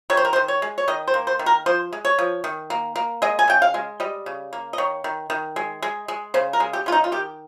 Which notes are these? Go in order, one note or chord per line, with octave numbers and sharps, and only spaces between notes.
D#3 C#5
C5
A#4
C5
D#3
C#5
G#3
C#5
D#3 D#5
C5
A#3
C5
D#3
A#4
F3 C5
G#3
C#5
F3
D#3
A#3
A#3
G#3 D#5
G#5
C#3 G5
F5
G#3
G3 D#5
C#3
A#3
D#5
D#3 C#5
D#3
D#3
G#3
G#3
G#3
C#3 C5
A#4
G#3
G4
C#3 F4
D#4
F4
D#3 G4